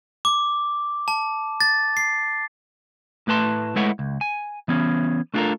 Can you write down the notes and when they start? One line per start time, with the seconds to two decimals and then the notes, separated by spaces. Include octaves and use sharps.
0.25 D6
1.08 A5
1.61 A6
1.97 C7
3.27 A2 A3 B4 A5 C6
3.76 G#3 A3 E4 B4 C#5 F#5
3.99 C#2
4.21 G#5
4.68 E3 B3 C#4
5.34 A3 D4 F4 F#4 A4 A#4